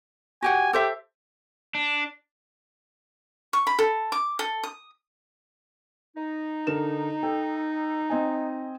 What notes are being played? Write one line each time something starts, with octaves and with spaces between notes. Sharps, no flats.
F#4 G4 F#5 G#5
G4 A4 C5 E5
D4
C#6
B5
A4
D6
A4
D#6
D#4
D3 A#4 E7
A4 G5
C4 D#5 G#5